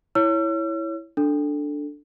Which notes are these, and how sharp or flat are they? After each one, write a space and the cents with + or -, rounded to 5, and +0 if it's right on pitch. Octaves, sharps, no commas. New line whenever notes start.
E4 +0 C#5 +0 E6 +45
D4 +0 A4 +0